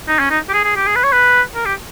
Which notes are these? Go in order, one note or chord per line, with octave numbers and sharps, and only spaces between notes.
D#4
C#4
D#4
G4
G#4
G#4
G4
G#4
B4
C#5
B4
A#4
G4